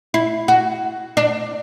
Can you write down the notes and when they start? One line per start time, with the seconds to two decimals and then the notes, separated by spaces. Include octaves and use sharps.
0.14 E4
0.48 F#4
1.17 D4